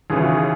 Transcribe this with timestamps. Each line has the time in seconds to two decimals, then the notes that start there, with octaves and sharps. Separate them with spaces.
0.10 D#2 C#3 E3 G#4
0.22 F#4
0.34 G#4